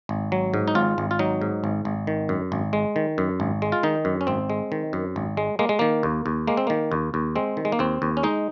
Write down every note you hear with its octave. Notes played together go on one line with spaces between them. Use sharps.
G#1
F#3
G#2
D#4
G#1 F4
G#1
F4
F#3 D#4
G#2
G#1
G#1
D#3
F#2
G#1
G#3
D#3
F#2
G#1
G#3
F4
D#3 D#4
F#2
C#4
G#1 C4
G#3
D#3
F#2
G#1
G#3
G#3 A#3
G#3
D#3 A#3
D#2
D#2
G#3 A#3
C4
D#3 A#3
D#2
D#2
G#3 C4
D#3
G#3
A#3
D#2 C4
D#2
C#4
G#3 D#4